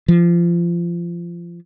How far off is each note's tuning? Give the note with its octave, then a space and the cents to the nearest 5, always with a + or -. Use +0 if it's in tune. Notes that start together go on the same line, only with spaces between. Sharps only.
F3 -25